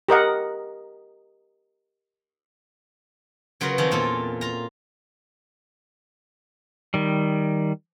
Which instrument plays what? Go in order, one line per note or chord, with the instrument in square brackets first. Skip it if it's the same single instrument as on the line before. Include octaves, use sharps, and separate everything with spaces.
[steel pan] G4 A#4 D#5 F#5
[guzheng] C#3 F#3 F4 A#4 B4
D#3 F3 C4 C#4
E2 A#2 F4 A4
F4 A#5
[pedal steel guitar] D#3 G3